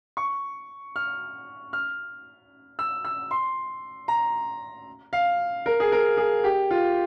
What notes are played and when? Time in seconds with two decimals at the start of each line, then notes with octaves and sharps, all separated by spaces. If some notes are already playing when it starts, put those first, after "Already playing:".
0.17 C#6
0.96 F6
1.73 F6
2.79 E6
3.05 E6
3.31 C6
4.08 A#5
5.13 F5
5.66 A#4
5.80 G#4
5.92 A#4
6.17 G#4
6.44 G4
6.71 F4